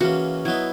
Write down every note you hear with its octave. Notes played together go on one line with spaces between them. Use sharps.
C#3 E3 A#3 C#4 F#4
F#3 B3 D#4 E4